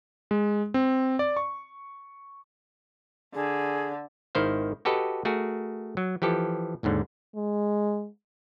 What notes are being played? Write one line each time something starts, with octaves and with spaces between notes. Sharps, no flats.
G#3
C4
D5
C#6
D3 G#4
G#1 D#3 E4 C5 F5
F#4 G4 A4 B4 D#5
A3 F#4 G#4 A#4
F#3
E3 F3 G4 A4
G#1 D#2 G#2 D3
G#3